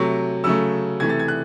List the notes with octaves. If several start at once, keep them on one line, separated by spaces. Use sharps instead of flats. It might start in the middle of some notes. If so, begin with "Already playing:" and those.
Already playing: C3 F#3 A3 C#6
C#3 F#3 A3 E6
C3 E3 A3 G#6
A6
G#6
F#6